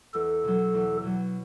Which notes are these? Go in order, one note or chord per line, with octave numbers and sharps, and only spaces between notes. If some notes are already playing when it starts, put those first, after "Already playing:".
E2 A4
B2 F#3
E2
B2 F#3